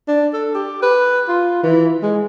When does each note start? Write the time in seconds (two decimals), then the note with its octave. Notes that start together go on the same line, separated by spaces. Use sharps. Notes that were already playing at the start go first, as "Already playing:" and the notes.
0.08 D4
0.33 A4
0.54 G4
0.82 B4
1.28 F4
1.63 E3
2.03 G#3